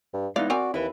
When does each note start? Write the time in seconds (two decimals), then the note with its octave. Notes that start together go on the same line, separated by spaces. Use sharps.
0.14 G2
0.36 G#3 B3 D#4 E4 D5 F5
0.50 C4 F#4 A#4 D5 G#5
0.74 D#2 E4 B4